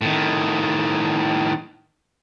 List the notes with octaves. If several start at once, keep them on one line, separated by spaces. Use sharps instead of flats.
A2 D#3